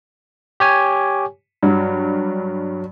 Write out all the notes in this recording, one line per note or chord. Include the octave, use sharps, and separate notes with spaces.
G4 C#5 G#5
G2 F#3